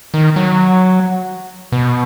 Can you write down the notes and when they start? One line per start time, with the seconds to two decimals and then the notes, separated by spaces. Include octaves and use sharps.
0.14 D#3
0.36 F#3
1.72 B2